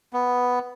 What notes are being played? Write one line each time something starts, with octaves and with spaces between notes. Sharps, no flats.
B3